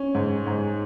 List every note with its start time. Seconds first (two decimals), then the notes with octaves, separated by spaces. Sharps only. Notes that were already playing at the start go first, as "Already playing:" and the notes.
Already playing: C#4
0.15 G#2
0.47 G#2